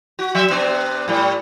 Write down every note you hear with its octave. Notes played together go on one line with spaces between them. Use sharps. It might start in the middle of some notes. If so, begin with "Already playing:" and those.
F#4
F#3 E5
C3 B3 D4
A2 G3